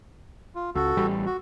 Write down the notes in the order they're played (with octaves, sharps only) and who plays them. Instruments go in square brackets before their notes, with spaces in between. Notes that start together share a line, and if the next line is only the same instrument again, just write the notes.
[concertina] F4
[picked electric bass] C#2 [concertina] F#4 A4
[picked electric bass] A1 G3
[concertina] F#4